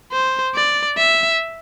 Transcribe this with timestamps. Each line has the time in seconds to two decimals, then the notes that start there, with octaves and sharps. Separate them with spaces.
0.12 C5
0.55 D5
0.98 E5